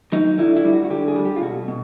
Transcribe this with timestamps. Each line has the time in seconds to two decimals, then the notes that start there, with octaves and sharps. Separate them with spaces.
0.12 F#3 D#4
0.38 D3 E4
0.56 E4
0.65 G3
0.73 F#4
0.84 F#4
0.90 D3 G4
1.08 G#4
1.16 G3
1.25 G4
1.36 F4
1.42 B2 F#4
1.68 B2